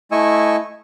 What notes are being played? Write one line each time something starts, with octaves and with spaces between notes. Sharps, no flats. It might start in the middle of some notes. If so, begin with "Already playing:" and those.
A3 E4 D#5 G#5 C#6 E6